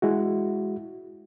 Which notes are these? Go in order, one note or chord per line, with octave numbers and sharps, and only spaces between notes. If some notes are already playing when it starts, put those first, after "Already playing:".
G#3 E4 F#4